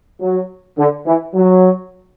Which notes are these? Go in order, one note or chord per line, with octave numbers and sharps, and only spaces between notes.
F#3
D3
E3
F#3